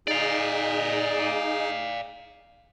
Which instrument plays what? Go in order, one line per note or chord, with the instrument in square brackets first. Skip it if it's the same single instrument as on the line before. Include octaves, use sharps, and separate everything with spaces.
[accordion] D#4 G#4 [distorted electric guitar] D5 F5